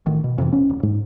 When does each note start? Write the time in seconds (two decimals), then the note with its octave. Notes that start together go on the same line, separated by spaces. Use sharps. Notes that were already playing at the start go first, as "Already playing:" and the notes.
0.06 A1 D#3
0.24 B2
0.38 F2 C3 E3
0.53 E1 C#4
0.69 D1
0.83 G#2